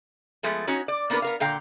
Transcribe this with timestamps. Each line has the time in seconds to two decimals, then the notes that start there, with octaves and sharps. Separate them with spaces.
0.43 F3 G#3 A3 B3
0.67 C#4 D#4 F#4 C#5
0.88 D5
1.10 A#3 B3 D4 G#4 A#4 B4
1.22 B3 A#4 F5
1.40 A#2 D3 F5 G5 A#5